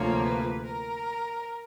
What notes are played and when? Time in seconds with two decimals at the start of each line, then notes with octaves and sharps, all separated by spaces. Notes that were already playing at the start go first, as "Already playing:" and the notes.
Already playing: D2 C3 F3 A#3 C#5
0.23 B4
0.65 A#4